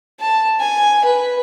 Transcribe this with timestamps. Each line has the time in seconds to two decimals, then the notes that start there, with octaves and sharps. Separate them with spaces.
0.20 A5
0.60 G#5
1.05 B4